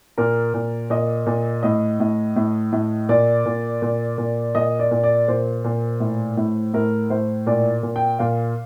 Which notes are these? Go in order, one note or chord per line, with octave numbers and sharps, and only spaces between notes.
A#2 A#4
A#2
A#2 D#5
A#2
A2 D#5
A2
A2
A2
A#2 D5
A#2
A#2
A#2
A#2 D#5
D5
A#2
D5
A#2 C5
A#2
A2
A2
A2 A#4
A2 C5
A#2 D5
A#2
G5
A#2 F5